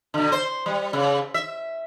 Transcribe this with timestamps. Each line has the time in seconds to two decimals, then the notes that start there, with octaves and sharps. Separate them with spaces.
0.14 B2 D3
0.32 C5
0.66 G3
0.93 C#3
1.34 E5